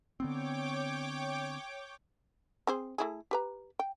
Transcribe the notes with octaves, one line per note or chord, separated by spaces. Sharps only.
D3 B3 C4 C#5 G5 D6
C4 G#4 C5
A3 E4 G#4
G4 B4 A#5
G5